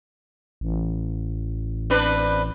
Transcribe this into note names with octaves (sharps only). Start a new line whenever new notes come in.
A1
C4 D4 B4